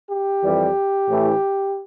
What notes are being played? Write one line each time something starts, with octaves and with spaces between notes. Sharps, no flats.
G4
F2 E3 G3
A1 A2 E3 A3